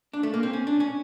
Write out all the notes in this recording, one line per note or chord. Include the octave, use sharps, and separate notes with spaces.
D4
A3
A#3
C4
C#4
D4
C#4